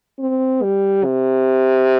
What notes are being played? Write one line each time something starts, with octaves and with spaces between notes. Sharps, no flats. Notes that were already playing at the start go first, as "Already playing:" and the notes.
C4
G3
C3